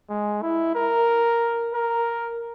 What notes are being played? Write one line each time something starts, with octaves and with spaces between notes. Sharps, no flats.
G#3
E4
A#4
A#4